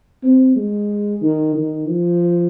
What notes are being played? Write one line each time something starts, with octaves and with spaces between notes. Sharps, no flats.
C4
G#3
D#3
D#3
F3